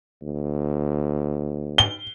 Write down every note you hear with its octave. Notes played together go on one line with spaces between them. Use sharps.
D2
G7